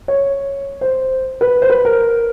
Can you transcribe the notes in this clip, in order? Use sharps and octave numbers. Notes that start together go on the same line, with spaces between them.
C#5
C5
B4
C5
B4
A#4